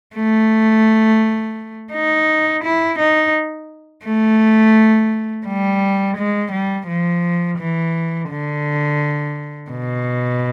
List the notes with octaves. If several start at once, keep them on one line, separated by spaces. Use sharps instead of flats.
A3
D#4
E4
D#4
A3
G3
G#3
G3
F3
E3
D3
B2